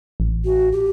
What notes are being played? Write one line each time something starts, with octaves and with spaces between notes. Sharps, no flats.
A1
F#4
G4